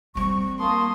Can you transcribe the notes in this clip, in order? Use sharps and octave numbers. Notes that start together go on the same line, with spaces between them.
G3 C4 C#6
A#3 A5 C6 D#6